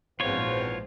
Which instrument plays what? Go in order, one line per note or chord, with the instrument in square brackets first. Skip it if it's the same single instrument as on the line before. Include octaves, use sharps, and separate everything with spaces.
[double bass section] A#1 G#2 C4 [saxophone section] E2 B2 F3 [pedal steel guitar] F4 C#5